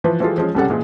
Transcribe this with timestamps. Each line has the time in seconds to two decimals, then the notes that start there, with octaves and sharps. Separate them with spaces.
0.04 E3 F3 B4
0.20 E3 F3 G3 G#3 F4 A4
0.38 F3 G#3 C#4
0.55 C2 C#3 G3 C#4 A4 F#5
0.70 A#2 E3 G#3